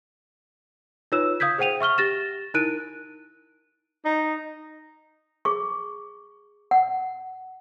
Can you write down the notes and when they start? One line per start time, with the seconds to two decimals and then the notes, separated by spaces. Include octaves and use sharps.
1.12 D#4 F4 B4 C#5 E6 E7
1.40 F5 D#6 G6 G#6 B6
1.58 G#4 C5 F#5 G5 D#7 F7
1.80 E5 C#6 F6 G7
1.98 G4 A6 A#6 E7
2.54 D#4 E4 A#4 F#6 D7 D#7
4.05 D#4
5.45 G#4 C#6
6.71 F#5